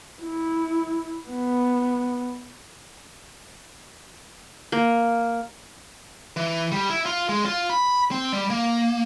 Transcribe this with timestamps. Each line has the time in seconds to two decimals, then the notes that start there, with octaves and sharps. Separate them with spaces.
0.22 E4
1.29 B3
4.72 A#3
6.36 E3
6.72 G3
6.90 E4
7.06 F4
7.29 G#3
7.46 F4
7.70 B5
8.11 C4
8.33 G3
8.50 A#3